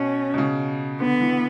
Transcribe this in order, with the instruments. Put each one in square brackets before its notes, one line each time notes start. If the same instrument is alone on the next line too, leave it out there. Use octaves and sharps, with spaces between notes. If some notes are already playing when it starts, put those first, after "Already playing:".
Already playing: [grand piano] B2 [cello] C#4
[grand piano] B2
C#3
[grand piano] D3 [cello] B3
[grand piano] E3